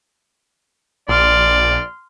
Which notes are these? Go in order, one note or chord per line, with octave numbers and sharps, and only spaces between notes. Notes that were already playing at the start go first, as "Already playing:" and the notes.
A#1 D5 C6 F6